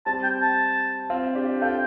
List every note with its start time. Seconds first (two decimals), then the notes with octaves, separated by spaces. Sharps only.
0.06 G3 C4 A5
0.23 G5
0.41 A5
1.10 C4 F4
1.35 D4 G4
1.61 F4 A4 G5